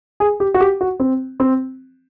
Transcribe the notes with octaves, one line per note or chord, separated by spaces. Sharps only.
G#4
G4
F#4
G4
F#4
C4
C4